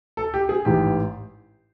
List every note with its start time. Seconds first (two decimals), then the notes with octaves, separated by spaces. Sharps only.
0.17 A4
0.34 G4
0.49 G#4
0.65 A1 G#2 E3 G4